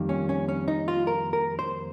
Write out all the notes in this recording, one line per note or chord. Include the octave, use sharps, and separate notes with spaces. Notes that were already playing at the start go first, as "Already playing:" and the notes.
Already playing: F2 D#3 G3 A#3
C#4
C#4
C#4
D#4
F4
A#4
A#4
C5